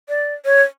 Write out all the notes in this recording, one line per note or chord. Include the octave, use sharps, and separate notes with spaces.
D5
C#5